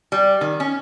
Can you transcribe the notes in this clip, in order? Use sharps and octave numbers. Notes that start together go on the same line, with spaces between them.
G3
D#3
C#4